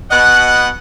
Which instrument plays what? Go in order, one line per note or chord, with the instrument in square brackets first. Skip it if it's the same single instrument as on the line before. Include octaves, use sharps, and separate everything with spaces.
[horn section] B2 D#5 F#5 [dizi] F#6